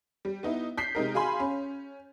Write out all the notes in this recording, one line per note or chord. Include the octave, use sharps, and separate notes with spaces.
G3
B3 D#4 E4
G6 B6 C7
C3 G#3 D#4 A#4
F#4 G#4 F5 G#5 B5 C6
C#4